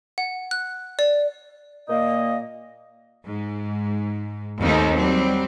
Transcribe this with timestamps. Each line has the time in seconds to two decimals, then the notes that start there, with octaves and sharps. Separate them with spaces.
0.18 F#5
0.51 F#6
0.99 D5
1.88 A#2 A#3 D#5
3.25 G#2
4.60 D#2 A3 C4 D#4
4.96 F#3 G3 C4